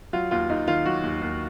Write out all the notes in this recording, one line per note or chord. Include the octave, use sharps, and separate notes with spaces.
F#3 F4
D#2 F4
D#2 D#4
D#3 F4
F#3 F#4
D#2
D#2